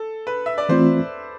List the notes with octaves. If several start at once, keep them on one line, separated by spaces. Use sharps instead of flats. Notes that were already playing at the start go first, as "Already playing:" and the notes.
Already playing: A4
B4
E5
D5
E3 A3 C4 F4 C5